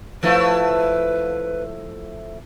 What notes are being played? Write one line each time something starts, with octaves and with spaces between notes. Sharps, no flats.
F3 A3 E4 B4